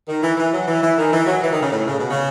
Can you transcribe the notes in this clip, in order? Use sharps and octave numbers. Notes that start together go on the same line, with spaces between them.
D#3
E3
E3
F#3
E3
E3
D#3
E3
F#3
E3
D#3
C#3
A2
C#3
B2
C#3